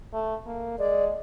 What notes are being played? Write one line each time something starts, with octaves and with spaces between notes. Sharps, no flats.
A3
A#3
G#3 D5